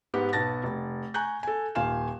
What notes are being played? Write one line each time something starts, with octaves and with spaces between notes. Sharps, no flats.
G#2 B3 G4
B1 B3 A5 A6 A#6
F1
G#5 A#5 C#6 F#6 G6
A4 G#5
D#1 F4 F5 G#5 E7